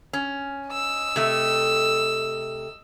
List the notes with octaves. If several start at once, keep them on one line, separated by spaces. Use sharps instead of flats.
C#4
D#5 E6
C3 A3